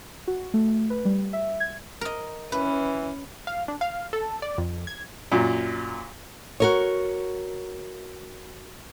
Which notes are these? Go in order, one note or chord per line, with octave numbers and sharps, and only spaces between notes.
F#4
A3
B4
G3
E5
G#6
A#4 D#5
E3 C#4 B4
F5
D4
F5
A4
D5
F2
G#6
F#2 A#2
F#4 A#4 C#5